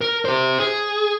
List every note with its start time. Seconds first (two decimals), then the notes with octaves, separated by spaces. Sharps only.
0.01 A#4
0.25 G4 C5
0.60 G#4